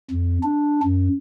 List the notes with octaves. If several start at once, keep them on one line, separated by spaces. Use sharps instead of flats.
F2
D4
F#2